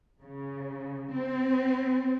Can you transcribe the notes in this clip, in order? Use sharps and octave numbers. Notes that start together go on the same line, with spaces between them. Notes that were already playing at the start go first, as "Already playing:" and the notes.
C#3
C4